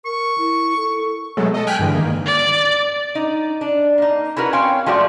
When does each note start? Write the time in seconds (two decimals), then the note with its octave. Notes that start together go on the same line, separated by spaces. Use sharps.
0.05 A#4 C#6
0.38 E4
0.77 A4
1.37 B2 F#3 G#3 A3 A4
1.54 A4 D#5
1.67 G5 G#5 F6 F#6 B6 D7
1.79 G2 D3 E3 G#3
1.95 D#3 A#3
2.26 D5
3.15 D#4
3.61 D4
3.98 A#3 D#4
4.36 E4 F#4 A#4 B4 F#5
4.53 C4 C#4 C#5 F5 G5
4.86 F3 G#3 A3 F#4 D5